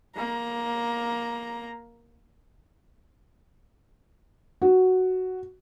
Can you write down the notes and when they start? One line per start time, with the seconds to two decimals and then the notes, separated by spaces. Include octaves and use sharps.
0.17 A#3 A#5
4.62 F#4